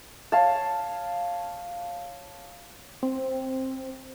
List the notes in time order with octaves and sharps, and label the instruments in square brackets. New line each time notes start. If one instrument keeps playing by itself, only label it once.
[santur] C#5 F5 A5
[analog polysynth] C4